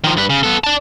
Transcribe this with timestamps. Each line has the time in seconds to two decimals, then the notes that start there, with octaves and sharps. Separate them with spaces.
0.04 D#3 F3
0.17 G2 B4
0.30 C#3
0.43 B3 A4
0.64 D5 A5